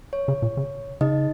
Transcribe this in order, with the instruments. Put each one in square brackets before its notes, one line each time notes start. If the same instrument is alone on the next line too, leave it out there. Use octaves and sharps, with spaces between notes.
[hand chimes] C#5
[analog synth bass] C#3
A#2
C#3
[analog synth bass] C#3 [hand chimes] D#4 D#5